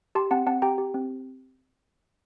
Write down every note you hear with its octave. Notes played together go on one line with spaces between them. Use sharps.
G4 A5 C6
C4 F#5 A5
C4 F#5 A5
G4 G5 A#5
G4
C4